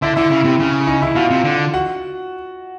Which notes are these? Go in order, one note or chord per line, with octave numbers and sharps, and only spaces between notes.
D3 E4 E5
D3 E4 E5
C#3
C3
C#3
D#4 D#5
E4 E5
B2 F4 F5
C3
D3
F#4 F#5